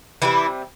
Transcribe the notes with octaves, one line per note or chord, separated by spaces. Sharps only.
C3 E3 G3 E4